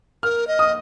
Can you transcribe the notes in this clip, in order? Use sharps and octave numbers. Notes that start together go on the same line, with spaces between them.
A#4 F6
D#5
D#6